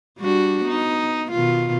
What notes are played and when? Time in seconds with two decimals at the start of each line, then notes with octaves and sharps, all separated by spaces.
0.19 G3 D4 F#4
0.65 B3 D#4
1.31 B2 D#3 F4